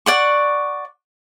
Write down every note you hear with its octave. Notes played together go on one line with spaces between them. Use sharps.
D5 F#5 C#6